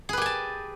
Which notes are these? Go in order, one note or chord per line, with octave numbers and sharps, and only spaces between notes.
G4 G#4 B4 G#5 A5